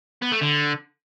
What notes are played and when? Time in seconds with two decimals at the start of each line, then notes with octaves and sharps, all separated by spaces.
0.22 B3
0.31 A3
0.41 D3